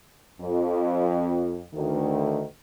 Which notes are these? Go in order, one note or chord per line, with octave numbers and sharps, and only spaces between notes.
F2
D2 D#3